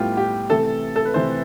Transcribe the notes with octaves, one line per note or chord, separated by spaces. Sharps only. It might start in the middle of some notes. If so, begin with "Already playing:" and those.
Already playing: A2 G3 B3 F4 G4
G4
C3 E3 A3 A4
A4
B4
C3 E3 A3 C5